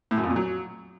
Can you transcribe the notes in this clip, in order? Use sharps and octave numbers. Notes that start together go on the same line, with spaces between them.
A2
F#2
F2
A#2
F#3